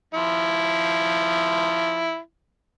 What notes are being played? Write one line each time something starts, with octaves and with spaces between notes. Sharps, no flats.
F3 E4